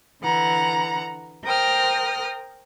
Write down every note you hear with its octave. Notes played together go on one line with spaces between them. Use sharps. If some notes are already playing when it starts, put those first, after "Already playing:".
D3 E3 F#5 A#5
A#4 C5 G5 D#6 F6